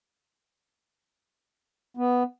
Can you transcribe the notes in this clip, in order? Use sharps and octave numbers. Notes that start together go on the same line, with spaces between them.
B3